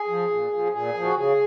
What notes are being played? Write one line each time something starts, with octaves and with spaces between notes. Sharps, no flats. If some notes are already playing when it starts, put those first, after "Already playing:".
Already playing: G#4
F3
A#2
F3
A#2 G#4
F3
F#4
C#3 G#4